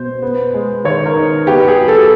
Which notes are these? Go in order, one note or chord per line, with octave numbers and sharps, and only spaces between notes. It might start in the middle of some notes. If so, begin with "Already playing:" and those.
Already playing: B2 C5
B3
G#3
D#3 C#5
A#4
D#4
B3 G4
G#4
F#3
A4